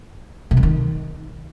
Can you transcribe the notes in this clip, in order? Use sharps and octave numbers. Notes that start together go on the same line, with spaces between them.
C3
F3
D#3